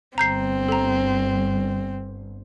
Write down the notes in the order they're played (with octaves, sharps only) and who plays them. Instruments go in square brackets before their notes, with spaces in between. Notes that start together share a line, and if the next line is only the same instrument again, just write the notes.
[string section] G1 [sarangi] C4 [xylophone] A#5 G6 C7
[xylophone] A4 A#5